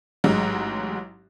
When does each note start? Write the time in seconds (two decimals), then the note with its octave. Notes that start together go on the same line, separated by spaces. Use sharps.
0.24 A1 G#2 F#3 G#3